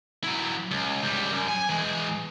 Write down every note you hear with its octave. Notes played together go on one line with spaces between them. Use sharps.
F#3 E4
C#2
C#2 G3
F#2
G#5
E3 G#3